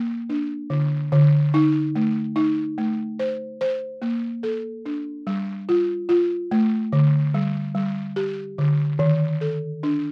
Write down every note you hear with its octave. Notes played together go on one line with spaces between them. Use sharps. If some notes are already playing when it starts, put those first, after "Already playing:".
Already playing: A#3
D4
D3
D3
D#4
A3
D#4
A3
C5
C5
A#3
A4
D4
G3
F4
F4
A3
D3
G3
G3
G4
D3
D#3
A4
D4